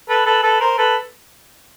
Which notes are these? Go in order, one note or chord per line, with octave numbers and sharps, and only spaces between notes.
A4 B4
A4 B4
A4 B4
A#4 C5
A4 B4